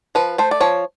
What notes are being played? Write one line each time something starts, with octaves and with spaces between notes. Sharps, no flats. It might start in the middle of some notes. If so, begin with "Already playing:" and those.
F3 B4
A3 C5
D5
F3 C#5